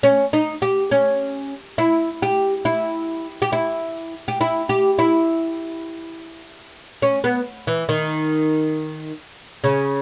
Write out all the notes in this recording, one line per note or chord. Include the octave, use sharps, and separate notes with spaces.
C#4
D#4
G4
C#4
E4
G4
E4
G4
E4
G4
E4
G4
E4
C#4
B3
E3
D#3
C#3